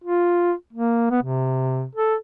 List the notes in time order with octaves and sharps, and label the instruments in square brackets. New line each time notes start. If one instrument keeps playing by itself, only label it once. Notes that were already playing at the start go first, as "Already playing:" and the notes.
[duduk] F4
A#3
B3
C3
A4